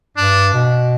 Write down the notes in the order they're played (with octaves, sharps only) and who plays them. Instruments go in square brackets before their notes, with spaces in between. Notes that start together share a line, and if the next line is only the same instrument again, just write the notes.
[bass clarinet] G2 [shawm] D4
[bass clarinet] B2